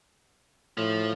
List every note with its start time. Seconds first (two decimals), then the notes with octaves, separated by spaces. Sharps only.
0.78 A2 F3